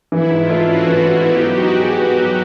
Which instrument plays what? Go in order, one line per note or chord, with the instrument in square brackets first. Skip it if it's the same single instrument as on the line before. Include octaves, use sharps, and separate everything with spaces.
[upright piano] E3 [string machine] E4
[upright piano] G#2
[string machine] F4
[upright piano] A3
[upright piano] C#4 [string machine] F#4
[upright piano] E3
G#2
[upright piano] B3 [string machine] G4
[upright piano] F#3
[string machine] F#4
[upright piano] D#4
[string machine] F#4 [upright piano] G#4
[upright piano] B3
F#3